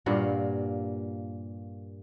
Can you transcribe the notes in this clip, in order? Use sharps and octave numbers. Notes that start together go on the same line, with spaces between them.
G2 A#2 A#3 F#5